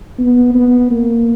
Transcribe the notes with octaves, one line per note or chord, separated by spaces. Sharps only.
B3
B3
A#3